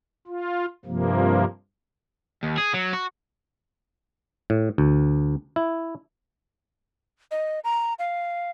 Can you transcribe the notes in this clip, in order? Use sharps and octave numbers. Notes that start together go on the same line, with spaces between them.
F4
G2 C3 F3 A#3
D#2
G#4
F#3
F#4
A2
D2
E4
D#5
A#5
F5